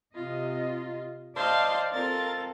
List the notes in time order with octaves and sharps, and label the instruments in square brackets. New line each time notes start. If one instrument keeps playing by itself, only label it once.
[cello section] C3 D#5 [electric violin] F4
[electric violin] C5 F5 [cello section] D5 [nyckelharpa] D#5 A5
[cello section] C4 [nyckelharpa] F4 A4 [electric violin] A#4 A6